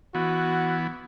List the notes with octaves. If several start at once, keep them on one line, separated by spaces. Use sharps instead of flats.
E3 B3 F#4